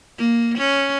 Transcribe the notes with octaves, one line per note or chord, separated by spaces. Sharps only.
A#3
C#4